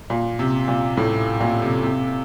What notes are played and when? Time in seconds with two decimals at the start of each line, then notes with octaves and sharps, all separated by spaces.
0.10 A#2
0.39 C3
0.68 A#2
0.97 A2
1.40 A#2
1.62 C3
1.83 C3